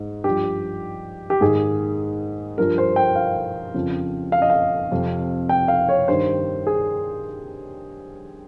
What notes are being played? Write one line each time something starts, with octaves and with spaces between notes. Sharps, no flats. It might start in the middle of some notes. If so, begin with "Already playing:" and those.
Already playing: G#2
G2 F3 G4
G4
G#2 D#3 G#4
G2 F3 A#4
C5
G5
F5
F2 C#3 F3
F5
D#5
F5
F2 C3 F3
G5
F5
C#5
G2 D#3 C5
G#4